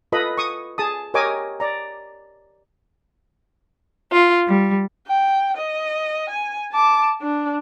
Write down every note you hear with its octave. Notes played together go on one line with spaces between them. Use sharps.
F4 A4 B4 D#5 B5
C#6 D#6
G#4 A5 D#6
G4 A#4 C#5 D#5 G#5 D6
D5 A#5
F4
G3
G5
D#5
G#5
A5 D6
D4